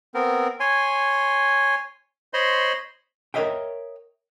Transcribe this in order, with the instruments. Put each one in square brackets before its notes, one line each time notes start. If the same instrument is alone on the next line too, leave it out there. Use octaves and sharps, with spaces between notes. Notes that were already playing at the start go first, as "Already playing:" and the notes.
[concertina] B3 C4 A#4
C#5 G#5 C6
C5 C#5 D#5 B5 C6
[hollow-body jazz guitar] A#4 B4 C#5 D#5 E5 G5